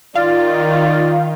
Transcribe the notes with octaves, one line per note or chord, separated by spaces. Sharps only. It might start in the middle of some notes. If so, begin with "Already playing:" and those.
D#3 F4 D5 F5